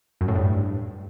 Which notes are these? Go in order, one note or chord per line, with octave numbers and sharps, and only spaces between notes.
F#2
A2
G2